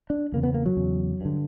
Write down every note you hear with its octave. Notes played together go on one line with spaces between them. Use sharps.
D4
E2 C#3 A#3
B3
A#3
F#3
E2 C#3
G2 D3